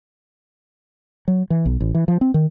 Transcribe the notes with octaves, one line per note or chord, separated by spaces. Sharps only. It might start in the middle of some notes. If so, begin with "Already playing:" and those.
F#3
E3
B1
A1
E3
F3
C4
D#3